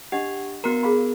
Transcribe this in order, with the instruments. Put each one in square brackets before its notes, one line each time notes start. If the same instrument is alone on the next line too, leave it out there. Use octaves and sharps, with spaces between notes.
[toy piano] D4 D#5 F#5 [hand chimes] G4
[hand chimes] B3 A#4 [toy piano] F#4 A#5
[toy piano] G#4 F5 B5